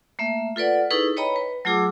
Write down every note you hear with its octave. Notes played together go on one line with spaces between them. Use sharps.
A3 A#3 E5
F4 A4 B4 D5 F#5
D#4 E4 G#4 A4 B4 C#6
B4 C#5 D#5 G5 A#5 B5
B4
F#3 A3 F4 G#4 D6 E6